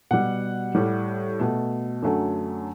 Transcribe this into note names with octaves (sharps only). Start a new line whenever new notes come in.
B2 G3 F#5
A2 G3
B2 A3
F#2 D3 F#3 A3